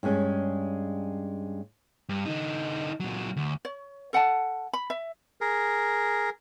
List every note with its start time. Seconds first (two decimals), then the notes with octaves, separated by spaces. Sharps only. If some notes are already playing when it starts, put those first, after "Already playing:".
0.03 G2 G3 G#3 C#4
2.09 G2
2.25 D3 D#4
3.00 A#2 F#3
3.37 D2
3.65 C#5
4.13 A4 F#5 G5 A5
4.73 B5
4.90 E5
5.41 G#4 A#4